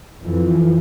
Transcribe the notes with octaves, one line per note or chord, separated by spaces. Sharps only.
F2 E3 F3